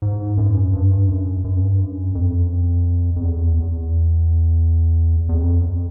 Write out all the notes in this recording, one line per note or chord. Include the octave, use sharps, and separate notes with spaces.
G#2
F#2
G2
F#2
F#2
G2
F#2
F2
F2
E2
E2
E2
F2